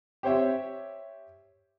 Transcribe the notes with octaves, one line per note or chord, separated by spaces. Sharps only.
G4 C5 C#5 E5